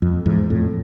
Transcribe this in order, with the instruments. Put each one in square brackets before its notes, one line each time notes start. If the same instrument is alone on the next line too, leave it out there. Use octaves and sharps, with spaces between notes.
[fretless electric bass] F2
E2 G#2
F2 A2